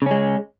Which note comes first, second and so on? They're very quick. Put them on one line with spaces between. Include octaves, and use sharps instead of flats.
C#3 C#4 G#3